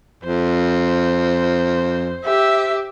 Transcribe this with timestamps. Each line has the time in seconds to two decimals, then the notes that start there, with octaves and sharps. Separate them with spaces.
0.23 F2 C5
2.25 G4 E5